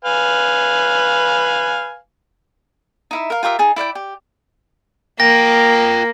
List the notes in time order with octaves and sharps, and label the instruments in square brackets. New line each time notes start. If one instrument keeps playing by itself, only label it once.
[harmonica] B4 F5 G#5
[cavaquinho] D#4 E4 E5
A#4 F5
F4 G4 A#4 E5
D#4 G#4 A5
E4 D5 F5 G5
G4
[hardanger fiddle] A#3 [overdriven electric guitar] F4 G5 [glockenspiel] A#6